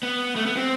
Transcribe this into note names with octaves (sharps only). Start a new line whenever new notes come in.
B3
A3
B3
C4